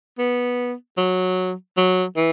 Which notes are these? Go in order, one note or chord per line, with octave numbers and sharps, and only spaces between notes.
B3
F#3
F#3
E3